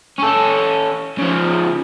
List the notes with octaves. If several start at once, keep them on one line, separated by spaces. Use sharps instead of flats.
C#4 A4
C#3 F3